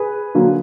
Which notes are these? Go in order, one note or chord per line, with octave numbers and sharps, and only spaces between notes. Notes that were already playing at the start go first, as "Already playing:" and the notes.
Already playing: G#4 B4
D3 F#3 A#3